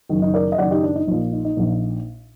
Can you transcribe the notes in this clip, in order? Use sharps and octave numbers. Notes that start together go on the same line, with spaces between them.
F#1 F#2 D#3 D#4
D#4
A#4 D5
D#5
F#1 F#2 D#3 D5 F#5
D#4 G4
D4
D#4
A#1 A#2 D#4
D#4
D#4
A#1 A#2